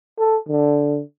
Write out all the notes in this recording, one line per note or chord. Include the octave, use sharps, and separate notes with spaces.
A4
D3